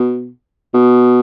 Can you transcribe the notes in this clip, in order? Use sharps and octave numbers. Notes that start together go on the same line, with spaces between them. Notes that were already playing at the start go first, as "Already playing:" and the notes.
Already playing: B2
B2